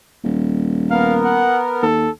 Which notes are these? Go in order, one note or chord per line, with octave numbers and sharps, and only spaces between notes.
D#1
B3 A#4 F5
F#5
D#2 A4